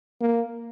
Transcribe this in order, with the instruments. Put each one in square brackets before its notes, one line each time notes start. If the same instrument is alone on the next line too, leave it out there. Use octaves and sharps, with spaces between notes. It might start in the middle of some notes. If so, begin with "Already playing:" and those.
[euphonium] A#3